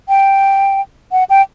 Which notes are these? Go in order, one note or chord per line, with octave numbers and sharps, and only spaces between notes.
G5
F#5
G5